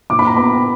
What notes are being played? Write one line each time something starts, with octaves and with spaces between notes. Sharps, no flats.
A#2 D6
B5
A#5
B3 B5